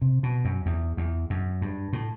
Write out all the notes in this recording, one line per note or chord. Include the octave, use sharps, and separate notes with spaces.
C3
B2
F#2
E2
E2
F#2
G2
A2